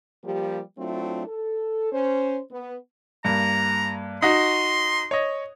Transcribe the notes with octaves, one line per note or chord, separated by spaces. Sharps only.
F3 G3 A#3 G4
F#3 A3 C4 D4 E4 F4
A4
C#4 C5
B3
G2 A#3 A#5
D#4 F#4 C6
C#5 D#5